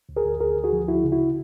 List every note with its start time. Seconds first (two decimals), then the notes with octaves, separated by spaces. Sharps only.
0.09 D2
0.16 G#4 A#4
0.25 D2
0.40 D2 G#4 A#4
0.56 D2
0.64 F#4 G#4
0.73 F3
0.88 D2 E4 F#4
1.04 C#3
1.12 E4 F#4